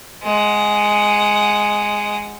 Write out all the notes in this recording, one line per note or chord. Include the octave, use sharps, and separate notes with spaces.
G#3 F#5